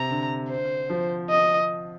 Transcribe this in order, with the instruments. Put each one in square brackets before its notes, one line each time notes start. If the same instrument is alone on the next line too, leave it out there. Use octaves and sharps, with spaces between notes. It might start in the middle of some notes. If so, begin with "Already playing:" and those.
Already playing: [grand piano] C3 [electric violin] A#5
[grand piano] D3
[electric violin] C5
[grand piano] F3
[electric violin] D#5